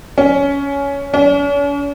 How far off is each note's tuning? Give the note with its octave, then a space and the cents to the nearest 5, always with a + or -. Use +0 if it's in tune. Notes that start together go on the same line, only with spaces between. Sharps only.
C#4 +15
C#4 +45